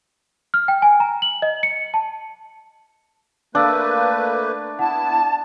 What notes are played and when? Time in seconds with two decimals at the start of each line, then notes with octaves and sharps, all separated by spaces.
0.54 F6
0.68 G5
0.82 G#5
1.00 A#5
1.22 F#7
1.42 D#5
1.63 C#7
1.94 A5
3.55 A3 A#3 D4 B4 D5 F5 E6
4.79 B3 E4 F#5 A5